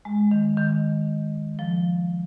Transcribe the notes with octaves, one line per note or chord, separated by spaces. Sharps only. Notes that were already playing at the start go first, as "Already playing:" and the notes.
G#3
D#3
D#3
F3